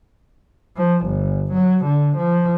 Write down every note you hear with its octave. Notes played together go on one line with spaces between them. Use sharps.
F3
G1
F#3
D3
F3